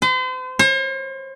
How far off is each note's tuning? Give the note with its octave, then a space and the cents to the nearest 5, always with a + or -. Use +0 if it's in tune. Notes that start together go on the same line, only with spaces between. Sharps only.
C5 -40
C5 +45